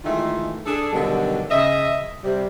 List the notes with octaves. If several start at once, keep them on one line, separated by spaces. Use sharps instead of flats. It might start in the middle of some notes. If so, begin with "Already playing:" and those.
D#3 E3 G#3 A3 F4
D4 G#4 A4
B2 D3 D#3 F#3 G3 F#4
C#3 D#5 E5
C3 G3